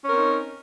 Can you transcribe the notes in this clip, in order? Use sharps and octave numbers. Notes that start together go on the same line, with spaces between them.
C4 C#4 D#4 A#4